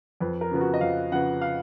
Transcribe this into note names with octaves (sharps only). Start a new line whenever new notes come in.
F2 B4
A#4
C#3 F3 B3
F#4
D#5
F2 F5
C#3 F3 B3 F#5
F5